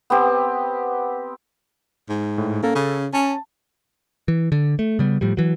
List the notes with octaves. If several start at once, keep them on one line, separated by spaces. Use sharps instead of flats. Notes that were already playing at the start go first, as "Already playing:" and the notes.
B3 C4 G4
G#2
A2
A#3 C#4 A4
C#3
C#4 A5
E3
D3
A3
C#3 G3 B3
A2 F3 G3
E3 F#3